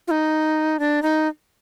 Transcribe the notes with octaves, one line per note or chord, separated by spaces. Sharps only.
F4
D#4
D4
D#4